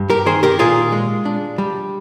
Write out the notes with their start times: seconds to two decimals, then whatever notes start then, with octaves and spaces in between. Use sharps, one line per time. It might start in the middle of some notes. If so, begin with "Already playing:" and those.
Already playing: G2
0.10 G4 A#4
0.26 D#3 G#4 C5
0.43 G4 A#4
0.59 A#2 F4 G#4
0.92 G#3
1.25 D4
1.58 G3